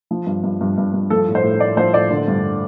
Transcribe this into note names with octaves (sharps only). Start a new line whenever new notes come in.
F3
G2
G2
G2
G2
G2
F3 A4
A2
C5
A2
A2 D5
F3 C5
A2 D5
D3
G2